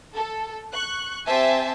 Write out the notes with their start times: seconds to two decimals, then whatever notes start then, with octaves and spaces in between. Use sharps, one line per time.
0.15 A4
0.73 C#6 F#6
1.26 C4 G4 C5 E5 G#5 A5